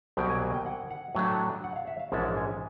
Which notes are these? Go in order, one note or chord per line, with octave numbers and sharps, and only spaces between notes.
C2 B2 F#3 A#3 G5
G#5
G#5
G5
F#5
F#5
A2 F#3 A3 D4 G#5
A5
F#5
F5
E5
F5
A#1 G#2 E3 G#3 C#4 A5
G#5